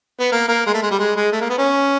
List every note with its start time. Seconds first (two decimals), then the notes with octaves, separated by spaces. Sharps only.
0.20 B3
0.32 A#3
0.48 A#3
0.66 G#3
0.74 A3
0.83 G#3
0.91 G3
1.00 G#3
1.16 G#3
1.33 A3
1.41 A#3
1.50 B3
1.58 C#4